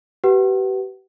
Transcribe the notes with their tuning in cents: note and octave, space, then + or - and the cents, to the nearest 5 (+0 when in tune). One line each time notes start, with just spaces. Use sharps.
G4 -35 B4 +0 F#5 +30